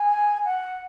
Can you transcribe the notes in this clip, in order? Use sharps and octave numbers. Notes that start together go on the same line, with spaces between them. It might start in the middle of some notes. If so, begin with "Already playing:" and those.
Already playing: G#5
F#5